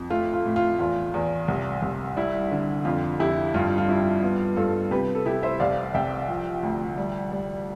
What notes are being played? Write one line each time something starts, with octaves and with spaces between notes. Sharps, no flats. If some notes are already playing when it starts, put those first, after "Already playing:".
Already playing: F2
A3 F4
F4
A2
F4
E2 F4
E2
C2
C2
G3 E4
D3
F2 F4
F2 E4 G4
G2 F4
F4
G2 E4
B3 F4
G2 F4 A4
C3 G4 B4
A4
C3 E4 G4
C5 E5
C2 D5 F5
C2 E5 G5
F3
D2
G3
G3